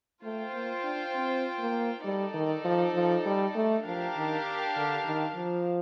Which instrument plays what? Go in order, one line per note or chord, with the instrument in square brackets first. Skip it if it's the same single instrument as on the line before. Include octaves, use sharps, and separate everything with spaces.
[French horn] A3 [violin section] F4 C5 G5
[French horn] A#3
D4
C4
A#3
[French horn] G3 [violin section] D#4 A4 D5
[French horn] D#3
F3
F3
G3
A3
[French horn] F3 [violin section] D4 G4 A#4 F5 A5
[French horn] D#3
D3
D#3
F3